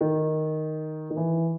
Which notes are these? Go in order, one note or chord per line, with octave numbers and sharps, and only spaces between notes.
D#3
D#3
E3